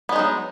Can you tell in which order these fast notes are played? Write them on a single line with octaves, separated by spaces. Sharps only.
B3 G#3 D#4 F#3